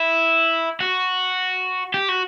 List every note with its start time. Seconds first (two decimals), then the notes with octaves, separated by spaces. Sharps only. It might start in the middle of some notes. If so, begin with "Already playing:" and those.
Already playing: E4
0.80 F#4
1.94 G4
2.09 F#4